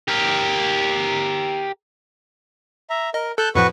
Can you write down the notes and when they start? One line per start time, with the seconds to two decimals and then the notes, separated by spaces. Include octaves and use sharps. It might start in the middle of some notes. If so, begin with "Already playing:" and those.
0.08 G4 A#4
2.90 E5 A#5
3.14 A#4 D#5
3.38 A4 A5 F#6 G6
3.55 F2 A2 F3 F#4 B4 C#6